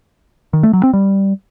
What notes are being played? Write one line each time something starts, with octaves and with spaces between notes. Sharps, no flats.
D#3
A3
F#3
C4
G3